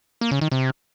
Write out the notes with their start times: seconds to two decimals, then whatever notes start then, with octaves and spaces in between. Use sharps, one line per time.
0.21 A#3
0.31 C#3
0.41 D#3
0.52 C3